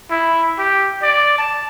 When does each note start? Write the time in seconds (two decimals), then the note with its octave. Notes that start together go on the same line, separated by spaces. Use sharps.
0.10 E4
0.58 G4
1.02 D5
1.38 A5